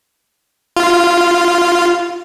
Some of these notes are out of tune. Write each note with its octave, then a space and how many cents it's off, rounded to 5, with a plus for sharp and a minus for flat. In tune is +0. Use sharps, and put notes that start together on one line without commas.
F4 -10